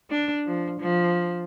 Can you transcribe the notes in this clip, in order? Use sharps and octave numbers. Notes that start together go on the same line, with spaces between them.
D4
F3
F3